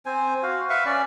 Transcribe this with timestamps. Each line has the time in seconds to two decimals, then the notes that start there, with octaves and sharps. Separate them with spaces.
0.06 C4 C5 G#5
0.43 F#4 F5
0.70 B4 E5 F5 C#6
0.86 C#4 D5